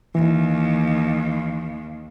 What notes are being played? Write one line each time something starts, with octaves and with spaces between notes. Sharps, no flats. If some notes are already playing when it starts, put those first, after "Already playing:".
D#2 E3